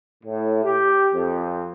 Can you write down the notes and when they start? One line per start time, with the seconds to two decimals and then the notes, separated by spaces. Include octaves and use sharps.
0.24 A2
0.64 G4
1.13 F2